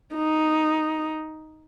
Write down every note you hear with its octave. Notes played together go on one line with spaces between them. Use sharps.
D#4